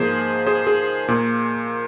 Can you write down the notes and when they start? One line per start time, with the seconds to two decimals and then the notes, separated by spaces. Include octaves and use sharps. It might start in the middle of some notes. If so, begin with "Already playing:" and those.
Already playing: G#2 F3 A#3 G#4 C5
0.47 G#4 C5
0.67 G#4
1.08 A#2 A#3